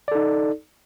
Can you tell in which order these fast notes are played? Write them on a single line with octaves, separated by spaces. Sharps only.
D5 A4 D#4